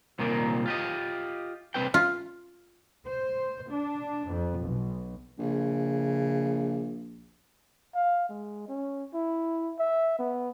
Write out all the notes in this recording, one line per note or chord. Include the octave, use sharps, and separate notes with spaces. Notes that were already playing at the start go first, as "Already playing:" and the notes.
C2 A#2 D#3 A#3
F4 G4 D#5
C2 C4 B4 G5
F4
C5
D4
F2
B1
A#1 C#3
F5
G#3
C#4
E4
E5
B3